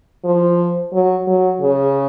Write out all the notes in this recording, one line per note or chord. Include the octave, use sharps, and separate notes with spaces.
F3
F#3
F#3
C#3